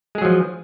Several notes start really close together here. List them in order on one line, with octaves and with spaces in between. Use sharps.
G#3 G#4 F#3 F3